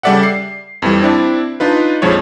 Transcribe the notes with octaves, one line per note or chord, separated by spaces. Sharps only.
C#3 G3 A4 D5 E5 F#5
C7
F2 E3 G3
C4 D4 E4 D5
D4 D#4 F4 B4
A#1 F2 F3 G#3 C#5